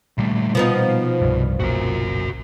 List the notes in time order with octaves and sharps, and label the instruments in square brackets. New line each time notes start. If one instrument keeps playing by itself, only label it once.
[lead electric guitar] D#2 A3 [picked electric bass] A#2 G3
[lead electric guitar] B2 [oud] F3 B3 D#4
[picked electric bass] C2 G2
[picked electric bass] F#1 B1 A#2 [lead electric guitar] F#4 A#4